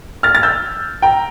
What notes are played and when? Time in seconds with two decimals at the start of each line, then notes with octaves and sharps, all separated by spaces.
0.23 F6 A6
0.35 A6
0.43 E6 G6
1.02 G5 A#5